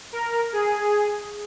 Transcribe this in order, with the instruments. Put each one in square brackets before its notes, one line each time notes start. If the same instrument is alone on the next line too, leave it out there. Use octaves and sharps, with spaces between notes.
[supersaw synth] A#4
G#4